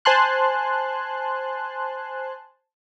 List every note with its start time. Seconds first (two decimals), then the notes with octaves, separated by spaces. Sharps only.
0.05 C5 G#5 A5 C6 F#6